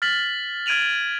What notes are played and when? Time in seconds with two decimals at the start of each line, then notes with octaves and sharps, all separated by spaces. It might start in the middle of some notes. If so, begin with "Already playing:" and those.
0.02 F6 A6 B6 F#7
0.66 F6 G#6 D7 D#7 F7 F#7